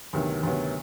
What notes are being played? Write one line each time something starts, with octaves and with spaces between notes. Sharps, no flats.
D2 C3 D#3 F#3 B3
D2 C3 D#3 F#3 B3